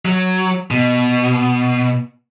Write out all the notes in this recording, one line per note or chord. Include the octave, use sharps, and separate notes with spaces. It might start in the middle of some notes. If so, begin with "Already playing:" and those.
F#3
B2